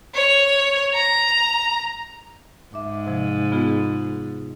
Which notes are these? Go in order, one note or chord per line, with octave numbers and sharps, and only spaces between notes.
C#5
A#5
G#2 E5 D6
C3 F3
B3 F4 G#4